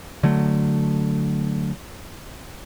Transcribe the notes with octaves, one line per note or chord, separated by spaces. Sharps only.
D3 F#3 A3